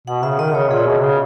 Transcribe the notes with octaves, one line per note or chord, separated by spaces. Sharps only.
B2 F#5
C#3 E5
D#3 D#5
C#3 C#5
A#2 G#4
B2
C#3